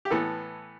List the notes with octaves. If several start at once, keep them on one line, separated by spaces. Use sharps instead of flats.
G4
A2 E3 B3 A4